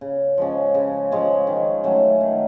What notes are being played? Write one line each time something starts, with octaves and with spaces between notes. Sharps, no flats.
C#3
F3 G#3 C#4
C#3
F3 G#3 C#4
D#3
F#3 A3 C#4
D#3